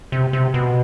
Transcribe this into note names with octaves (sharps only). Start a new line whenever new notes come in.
C3
C3
B2